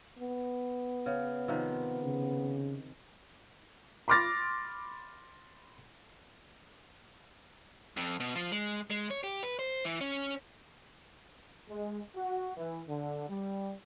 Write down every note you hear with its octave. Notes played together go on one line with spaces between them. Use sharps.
B3
C#3
C3 D#3 F3
C#3
B5 C6 D6 F6 A6 A#6
F2
B2
F3
G#3
G#3
C#5
G4
B4
C5
E3
C#4
G#3
F#4
E3
D3
G3